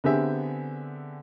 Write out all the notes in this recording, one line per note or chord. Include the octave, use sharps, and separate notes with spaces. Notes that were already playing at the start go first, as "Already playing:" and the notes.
D3 B3 C4 G4 G#4 E5